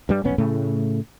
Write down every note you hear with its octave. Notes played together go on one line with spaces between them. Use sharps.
G2 G3
F1 B1 B3 C#4
A2 C#3 A3